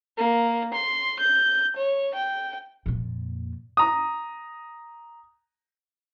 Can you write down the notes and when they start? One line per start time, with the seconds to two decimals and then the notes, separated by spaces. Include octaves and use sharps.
0.18 A#3
0.75 C6
1.20 G6
1.77 C#5
2.15 G5
2.86 F2 A#2
3.77 A#5 D#6